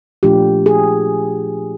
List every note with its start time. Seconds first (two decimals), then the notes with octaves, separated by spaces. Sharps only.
0.23 A#2 F3 A3 D4 F4 G4
0.66 G#4